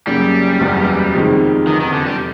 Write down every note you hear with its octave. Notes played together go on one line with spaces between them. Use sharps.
F#2 C#3 F#3 G3 A#3
F#1 E2 C#3 F#3 B3
F2 C3 D#3 G#3 C4
F1 E2 C3 D#3
D#3
D3
G3